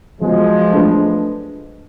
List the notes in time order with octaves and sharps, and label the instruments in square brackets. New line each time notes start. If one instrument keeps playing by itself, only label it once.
[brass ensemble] F3 G#3 [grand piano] F#3 B3 F#4
[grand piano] A3 D4 F4 B4